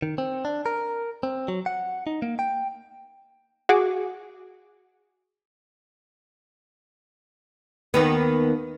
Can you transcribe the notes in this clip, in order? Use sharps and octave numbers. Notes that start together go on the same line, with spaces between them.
D#3
C4
D4
A#4
C4
F#3
F#5
D#4
A#3
G5
F#4 G#4 D6
D#2 D#3 B3